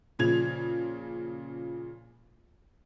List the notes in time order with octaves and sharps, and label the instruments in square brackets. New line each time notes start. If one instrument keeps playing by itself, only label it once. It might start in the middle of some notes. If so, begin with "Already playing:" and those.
[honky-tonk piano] A#2 C#3 F3 G#6 F7